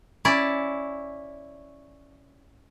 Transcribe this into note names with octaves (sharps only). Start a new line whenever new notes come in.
C#4 E4 D5